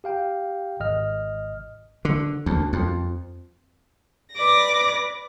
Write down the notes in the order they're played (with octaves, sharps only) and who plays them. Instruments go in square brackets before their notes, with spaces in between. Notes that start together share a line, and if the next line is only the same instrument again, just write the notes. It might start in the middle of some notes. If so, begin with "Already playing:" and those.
[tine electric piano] G4 F5 G5
G#1 D#5 F6
[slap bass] D3
D2
F2
[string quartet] B4 D5 D6 A#6